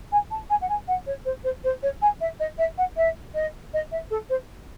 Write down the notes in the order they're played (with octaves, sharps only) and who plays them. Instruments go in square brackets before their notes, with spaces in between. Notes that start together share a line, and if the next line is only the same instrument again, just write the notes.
[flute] G#5
A5
G#5
F#5
G#5
F#5
C#5
C5
C5
C5
C#5
G#5
E5
D#5
E5
F#5
E5
D#5
D#5
E5
A4
C5